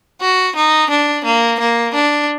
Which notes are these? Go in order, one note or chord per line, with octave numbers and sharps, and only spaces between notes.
F#4
D#4
D4
A#3
A#3
D4